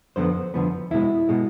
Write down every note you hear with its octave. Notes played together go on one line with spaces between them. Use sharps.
F2 D3 F3 B3 C5
F2 D3 F3 B3
E2 B2 G#3 E4
B2 G#3